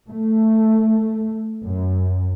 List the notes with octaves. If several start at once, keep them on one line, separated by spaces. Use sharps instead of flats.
A3
F#2